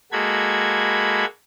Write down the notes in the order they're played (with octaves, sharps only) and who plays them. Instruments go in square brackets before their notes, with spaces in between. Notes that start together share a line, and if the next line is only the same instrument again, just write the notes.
[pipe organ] G#3 A#3 F#4 A4 B5 G#6